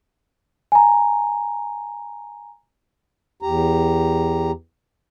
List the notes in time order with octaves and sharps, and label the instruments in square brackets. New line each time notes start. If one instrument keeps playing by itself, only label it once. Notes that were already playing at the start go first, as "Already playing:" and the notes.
[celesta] G#5 A#5
[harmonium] E2 G4 A#5